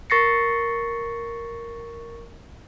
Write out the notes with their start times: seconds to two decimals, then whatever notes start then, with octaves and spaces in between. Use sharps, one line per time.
0.10 A#4 C#6 A6 A#6 C7 C#7